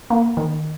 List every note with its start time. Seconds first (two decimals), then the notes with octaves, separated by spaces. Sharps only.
0.10 A#3
0.37 D#3